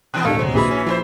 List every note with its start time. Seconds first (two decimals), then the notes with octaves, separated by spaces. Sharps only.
0.14 B2 E3 B3 F#6
0.25 G#1 D#2 A#2 D3 A3 A4 F5
0.39 D2 C3 F#3 G#3 C5
0.54 A#1 E3 G#3 F#4 G#4 B5
0.71 C#4
0.87 F3 E4 F4 C5